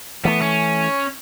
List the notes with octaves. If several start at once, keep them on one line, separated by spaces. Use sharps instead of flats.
E3 A3 B3
C#4